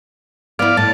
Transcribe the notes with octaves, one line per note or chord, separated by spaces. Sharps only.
B3 E4 D5 F5
A2 A5